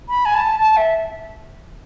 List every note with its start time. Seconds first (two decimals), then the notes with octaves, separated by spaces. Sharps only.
0.09 B5
0.25 G#5
0.35 A5
0.60 A5
0.77 E5